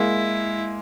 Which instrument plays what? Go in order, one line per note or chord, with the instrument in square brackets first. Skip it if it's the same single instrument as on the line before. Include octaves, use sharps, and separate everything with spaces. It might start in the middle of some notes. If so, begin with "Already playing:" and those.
Already playing: [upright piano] G#3 A#3 [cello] E4